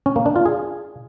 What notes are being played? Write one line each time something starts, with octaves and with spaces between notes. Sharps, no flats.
C#4
A#3
D4
F4
G#4